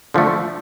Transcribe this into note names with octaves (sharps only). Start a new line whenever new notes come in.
D3 F3 A3